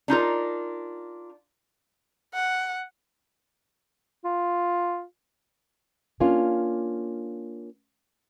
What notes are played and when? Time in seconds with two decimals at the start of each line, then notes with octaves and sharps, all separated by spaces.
0.08 D4 D#4 F4 A#4
2.34 F#5
4.25 F4
6.20 A#3 C#4 D4 F4